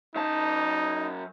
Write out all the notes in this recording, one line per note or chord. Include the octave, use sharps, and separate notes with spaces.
F#2 D#4 A5